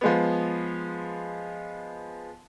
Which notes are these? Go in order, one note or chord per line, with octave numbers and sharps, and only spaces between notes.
F3 G#3 B3